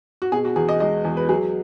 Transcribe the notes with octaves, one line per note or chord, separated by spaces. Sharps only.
F#4
B2 G#4
F#4
E2 G#4
D#5
G#3 D#5
E2
B4
F#3 G#4